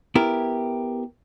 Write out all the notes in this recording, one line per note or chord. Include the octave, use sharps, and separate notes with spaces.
B3 E4 G4 A#4